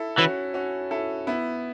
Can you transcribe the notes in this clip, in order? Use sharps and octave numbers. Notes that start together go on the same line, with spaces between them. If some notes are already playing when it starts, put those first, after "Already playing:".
Already playing: E4 A4
E3 C#4 F#4
C#4 F#4
E4 A4
B3 E4